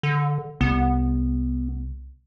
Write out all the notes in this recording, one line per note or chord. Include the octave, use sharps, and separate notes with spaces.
D3
C2 B3